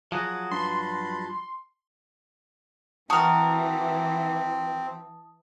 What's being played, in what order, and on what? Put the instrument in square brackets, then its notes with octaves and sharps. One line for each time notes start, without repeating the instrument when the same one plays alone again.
[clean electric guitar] F3 F#3 F#4 [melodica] G#4 F#5
[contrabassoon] G2 [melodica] A5 B5 [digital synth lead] C6
[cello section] E3 [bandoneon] C4 [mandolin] F#4 A#4 [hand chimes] A5 D#6